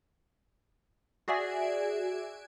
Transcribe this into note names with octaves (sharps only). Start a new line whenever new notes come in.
F#4 G#4 D5 E5 G#5